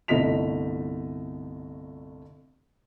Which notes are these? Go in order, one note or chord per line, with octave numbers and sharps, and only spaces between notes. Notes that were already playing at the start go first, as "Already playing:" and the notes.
G1 C2 A3 D#5 B6 F7